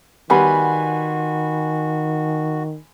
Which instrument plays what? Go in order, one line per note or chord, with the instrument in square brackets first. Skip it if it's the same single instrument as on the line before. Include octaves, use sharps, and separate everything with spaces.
[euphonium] D#3 [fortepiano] G3 B3 [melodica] F#4 [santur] G#5 B5 C6